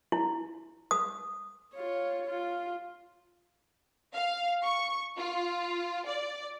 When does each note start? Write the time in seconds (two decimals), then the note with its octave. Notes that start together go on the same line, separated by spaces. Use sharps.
0.12 E4
0.91 D#6
1.75 F4 C#5
2.26 F4
4.13 F5
4.63 C#6
5.17 F4
6.06 D5